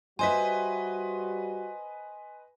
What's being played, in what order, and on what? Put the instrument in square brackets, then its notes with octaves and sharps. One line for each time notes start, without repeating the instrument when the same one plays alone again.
[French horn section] G3 F#4 [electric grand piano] B4 D#5 C6 [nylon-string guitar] C5 E5 [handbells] G#5